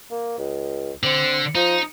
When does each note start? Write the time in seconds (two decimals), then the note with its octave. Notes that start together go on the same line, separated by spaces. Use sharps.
0.11 A#3
0.38 C#2
1.03 D3 C4
1.55 F3 D#4